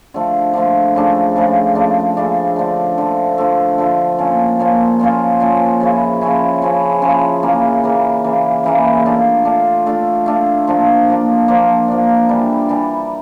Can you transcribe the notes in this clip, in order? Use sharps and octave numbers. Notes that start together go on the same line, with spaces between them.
D3 F3 A3
D3 F3 A3
C#3 F3 A3 D4
C#3 F3 A3 D4
C#3 F3 A3 D4
C#3 F3 A3 D4
D3 F3 A3
D3 F3 A3
D3 F3 A3
D3 F3 A3
A#2 F3 C#4 F4
A#2 F3 C#4 F4
A#2 F3 C#4 F4
A#2 F3 C#4 F4
C#3 F3 C#4 E4
C#3 F3 C#4 E4
C#3 F3 C#4 E4
C#3 F3 C#4 E4
C#3 E3 A#3
C#3 E3 A#3
C#3 E3 A#3
C#3 E3 A#3
A3 D4 F4
A3 D4 F4
A3 D4 F4
A3 D4 F4
F3 A#3 D4
F3 A#3 D4
F3 A#3 D4
F3 A#3 D4
E3 G3 D4
E3 G3 D4